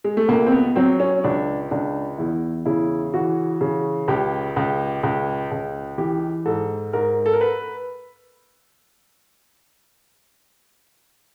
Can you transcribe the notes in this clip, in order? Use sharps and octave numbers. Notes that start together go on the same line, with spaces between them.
G#3
A3
C#2 A#3
C4
B3
F#3 C4
C#4
C#2 D4
C#2 D4
E2 E4
C#3 E4
E3 F#4
C#3
C#2 G4
C#2
C#2
C#2
E3 G4
G#2 A4
G#2 A#4
A4
A#4
B4